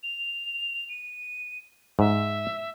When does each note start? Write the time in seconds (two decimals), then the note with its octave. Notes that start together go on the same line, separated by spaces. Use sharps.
0.03 F7
0.89 D#7
1.99 G#2 E5